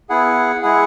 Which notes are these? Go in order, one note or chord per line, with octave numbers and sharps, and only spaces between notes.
B3 E4 G#4 F#5
G#3 E4 G#4 F#5